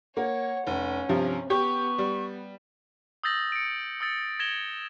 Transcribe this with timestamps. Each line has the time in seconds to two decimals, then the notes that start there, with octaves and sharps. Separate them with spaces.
0.17 A#3 C#5 F#5
0.67 F1 C#4
1.09 G2 C3 F3
1.50 B3 G4 C#6
1.98 G3
3.24 D#6 E6 G6 A6 A#6 F#7
3.52 C#7 D7
4.01 D#6 E6 A6 C#7
4.40 G#6 A#6 E7 F7 G7